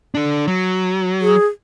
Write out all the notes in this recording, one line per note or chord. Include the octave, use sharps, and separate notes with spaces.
D3 D4
F#3
G#4